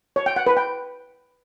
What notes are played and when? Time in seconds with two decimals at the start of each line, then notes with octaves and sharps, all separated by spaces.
0.16 C#5
0.26 G5
0.36 F#5
0.47 B4
0.57 G5